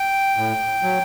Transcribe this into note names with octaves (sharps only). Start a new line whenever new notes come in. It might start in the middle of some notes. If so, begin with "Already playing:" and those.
Already playing: G5
A2
F#3